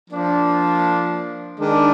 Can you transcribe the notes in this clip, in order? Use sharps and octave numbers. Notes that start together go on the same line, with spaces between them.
F3 A#3 D4
D#3 G#3 D4